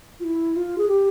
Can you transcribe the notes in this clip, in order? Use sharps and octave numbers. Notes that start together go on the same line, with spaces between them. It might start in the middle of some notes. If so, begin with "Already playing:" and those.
F4
E4
F4
G#4
G4